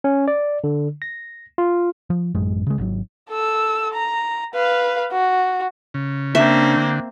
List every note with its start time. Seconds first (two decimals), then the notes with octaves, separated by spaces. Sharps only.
0.04 C#4
0.28 D5
0.64 D3
1.02 A#6
1.58 F4
2.10 F3
2.35 A1 F#2 F#3 G#3
2.67 C#3 G#3
2.78 G#1 G#2 D3 F#3
3.30 A4 E6
3.93 A#5
4.54 B4 F5
5.12 F#4
5.94 C#3
6.35 A#3 C4 D4 E5
6.77 D3